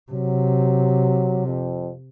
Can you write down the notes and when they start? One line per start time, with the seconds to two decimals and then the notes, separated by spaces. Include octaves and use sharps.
0.12 C3 F#3
1.46 F2